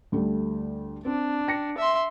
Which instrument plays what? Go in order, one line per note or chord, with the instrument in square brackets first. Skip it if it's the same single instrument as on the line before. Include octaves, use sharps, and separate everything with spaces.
[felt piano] D2 G3 A3
[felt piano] C4 [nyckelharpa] D4
[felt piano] G5 A#6 C#7
[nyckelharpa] E5 C6